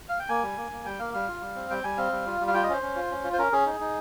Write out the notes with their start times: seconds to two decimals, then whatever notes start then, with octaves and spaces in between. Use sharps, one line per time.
0.09 F5
0.19 G5
0.29 A#3 G#5
0.43 G3
0.57 A#3
0.72 A#3
0.85 G3 G5
0.99 A#3 F5
1.14 G3 F5
1.28 F4
1.41 G3
1.55 C4
1.70 G3 G5
1.84 G3 G#5
1.98 C4 F5
2.12 G3
2.26 F4
2.41 G3
2.48 F5
2.54 F4 G5
2.63 D#5
2.69 C#4 C5
2.82 C#4
2.96 F4
3.11 C#4
3.24 F4
3.33 C5
3.38 C#4 A#4
3.52 C#4 G#4
3.66 D#4
3.80 D#4